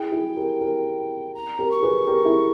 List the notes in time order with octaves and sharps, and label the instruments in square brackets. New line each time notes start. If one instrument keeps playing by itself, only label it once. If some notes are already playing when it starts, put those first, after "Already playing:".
Already playing: [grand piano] E4 G#4 [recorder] G5
[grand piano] E4 G#4
G4 A#4
G4 A#4
[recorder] A#5
[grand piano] G4 A#4
[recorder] C#6
[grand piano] G#4 B4
G4 A#4
E4 G#4